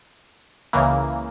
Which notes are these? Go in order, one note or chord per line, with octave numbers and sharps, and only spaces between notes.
C#2 C#3 E3 A#3